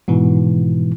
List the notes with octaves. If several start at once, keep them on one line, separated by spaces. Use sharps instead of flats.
G#2 B2 E3